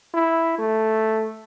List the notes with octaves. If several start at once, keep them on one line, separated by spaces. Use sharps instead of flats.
E4
A3